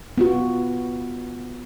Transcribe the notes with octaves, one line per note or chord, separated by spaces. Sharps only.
B3 F4 F#4